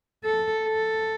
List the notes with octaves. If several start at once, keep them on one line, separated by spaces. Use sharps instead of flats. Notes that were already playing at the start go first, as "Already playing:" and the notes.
A4
A4